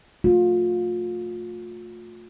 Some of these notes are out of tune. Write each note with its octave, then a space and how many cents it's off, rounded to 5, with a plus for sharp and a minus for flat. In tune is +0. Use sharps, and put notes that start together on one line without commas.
A3 +15 F4 +30